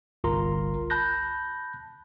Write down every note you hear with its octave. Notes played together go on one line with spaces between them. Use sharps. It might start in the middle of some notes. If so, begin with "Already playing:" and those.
G1 C2 F4 A#4 A#5 C6
A5 B5 F#6 G6 A#6